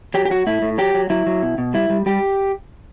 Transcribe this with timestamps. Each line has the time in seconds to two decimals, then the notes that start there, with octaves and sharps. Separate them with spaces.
0.14 F#3 G4
0.25 G4
0.30 F#3 F#4
0.47 A2 E4
0.62 A2
0.78 F#3 G4
0.94 F#3
1.10 F#3 E4
1.26 F#3
1.43 B2
1.58 B2
1.74 G3 E4
1.90 G3
2.06 G3 G4